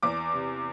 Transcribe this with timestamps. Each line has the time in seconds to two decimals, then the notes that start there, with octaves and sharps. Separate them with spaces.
0.03 E2 D6
0.33 C3